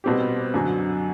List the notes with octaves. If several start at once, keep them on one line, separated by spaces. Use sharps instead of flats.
B2 G3 C4 G4
F#2 D3 F#3